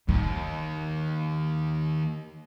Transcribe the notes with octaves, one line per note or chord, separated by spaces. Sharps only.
D#2 D#3